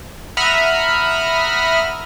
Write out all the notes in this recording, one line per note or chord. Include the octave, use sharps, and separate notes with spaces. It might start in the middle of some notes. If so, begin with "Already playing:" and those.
E5 F#5 A#5 B5 D#6 F6